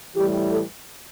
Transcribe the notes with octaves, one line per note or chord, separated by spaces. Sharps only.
A2 E3 G3 G4
A4